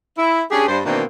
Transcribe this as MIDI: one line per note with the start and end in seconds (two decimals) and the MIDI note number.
0.18 0.42 64
0.51 0.66 61
0.51 0.66 62
0.51 0.66 67
0.51 0.66 68
0.67 0.79 43
0.67 0.79 72
0.85 1.03 47
0.85 1.03 51
0.85 1.03 52
0.85 1.03 58
0.85 1.03 60
0.85 1.03 62